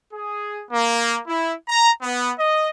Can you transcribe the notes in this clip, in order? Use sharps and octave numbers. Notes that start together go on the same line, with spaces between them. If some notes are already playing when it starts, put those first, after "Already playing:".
G#4
A#3
E4
A#5
B3
D#5